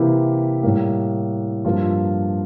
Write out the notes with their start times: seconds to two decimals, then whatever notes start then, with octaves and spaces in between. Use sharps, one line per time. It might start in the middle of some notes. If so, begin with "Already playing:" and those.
Already playing: C3 E3 A#3 E4 G4
0.63 A2 G3 A#3
1.65 G2 F3 A#3 F4